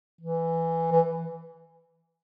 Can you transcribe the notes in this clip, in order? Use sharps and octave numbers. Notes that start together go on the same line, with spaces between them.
E3
E3